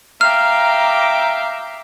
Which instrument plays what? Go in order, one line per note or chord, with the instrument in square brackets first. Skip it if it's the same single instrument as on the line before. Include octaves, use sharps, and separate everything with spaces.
[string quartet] E5 G5 D6 [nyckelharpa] F5 [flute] A#5 [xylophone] F6